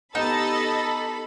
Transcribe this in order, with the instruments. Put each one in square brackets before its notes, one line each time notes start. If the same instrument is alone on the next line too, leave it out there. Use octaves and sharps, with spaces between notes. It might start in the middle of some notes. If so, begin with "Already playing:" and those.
[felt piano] B3 G4 [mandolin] D#4 [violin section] A4 B5 [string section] D#5 E6 A6